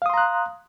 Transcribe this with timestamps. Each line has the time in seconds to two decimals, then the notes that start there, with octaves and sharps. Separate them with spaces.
0.02 F5
0.06 D#6
0.10 C6
0.14 A#5
0.18 F#6